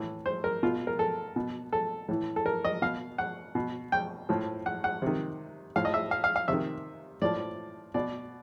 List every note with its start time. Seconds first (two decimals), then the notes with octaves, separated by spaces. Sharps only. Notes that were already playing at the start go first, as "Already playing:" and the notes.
Already playing: A2 E3
0.26 C5
0.44 A#4
0.63 B2 F4
0.87 A#4
0.99 A4
1.36 B2
1.73 A4
2.08 A2 E3
2.36 A4
2.46 A#4
2.65 D#5
2.82 B2 F5
3.18 F#5
3.55 B2
3.92 G5
4.29 A2 F3
4.66 F#5
4.84 F#5
5.02 C3 D#3
5.76 A2 F3 F5
5.85 D#5
5.94 E5
6.11 F5
6.24 F5
6.36 F5
6.48 C3 D#3 E5
7.22 A2 F3 D5
7.94 B2 D5